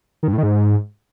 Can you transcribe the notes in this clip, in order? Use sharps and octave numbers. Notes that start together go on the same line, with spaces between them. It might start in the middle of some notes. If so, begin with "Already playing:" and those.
D#3
G2
A2
D#3
G#2